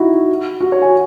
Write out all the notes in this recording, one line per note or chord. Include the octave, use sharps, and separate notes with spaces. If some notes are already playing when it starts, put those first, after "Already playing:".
Already playing: D#4 E4 F#4
F#4
C#5
G#5